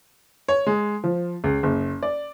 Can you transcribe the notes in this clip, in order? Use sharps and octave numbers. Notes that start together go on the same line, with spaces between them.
C#5
G#3
F3
C#2
F#1
D5